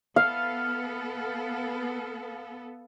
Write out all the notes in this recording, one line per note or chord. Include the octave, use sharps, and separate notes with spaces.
B3 A4 F5